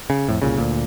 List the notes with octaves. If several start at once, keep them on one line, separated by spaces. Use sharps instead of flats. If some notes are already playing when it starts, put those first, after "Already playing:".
C#3
F2 A2
C2 A#2 C#3
D2 A#2